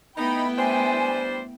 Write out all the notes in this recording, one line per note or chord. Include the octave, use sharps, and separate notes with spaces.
A3 B3 D#4 E4 G5 B5
G3 D4 C5 G#5